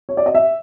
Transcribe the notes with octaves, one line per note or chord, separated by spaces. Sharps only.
C#5
D5
D#5
E5